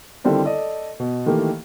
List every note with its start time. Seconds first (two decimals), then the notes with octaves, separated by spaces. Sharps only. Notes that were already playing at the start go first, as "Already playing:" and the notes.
0.24 D3 D#3 G3 C4 D4 E4
0.45 A4 D5 D#5
1.00 B2
1.26 D#3 E3 A3 A#3 G4